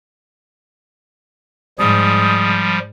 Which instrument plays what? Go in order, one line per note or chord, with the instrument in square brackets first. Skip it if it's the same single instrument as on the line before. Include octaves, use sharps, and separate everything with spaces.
[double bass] G#2 [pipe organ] F3 G3 [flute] D#6